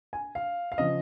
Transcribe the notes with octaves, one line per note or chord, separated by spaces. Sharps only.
G#5
F5
F5
C#3 F3 D#5